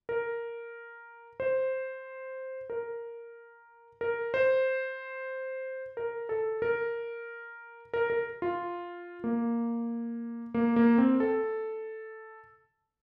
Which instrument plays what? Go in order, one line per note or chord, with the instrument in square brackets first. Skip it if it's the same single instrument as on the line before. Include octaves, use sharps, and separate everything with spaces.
[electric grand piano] A#4
C5
A#4
A#4
C5
A#4
A4
A#4
A#4
A#4
F4
A#3
A#3
A#3
C4
A4